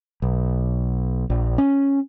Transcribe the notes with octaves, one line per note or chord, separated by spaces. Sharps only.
B1
A#1
C#4